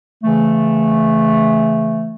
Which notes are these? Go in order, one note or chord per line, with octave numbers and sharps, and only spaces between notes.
C#3 E3 A3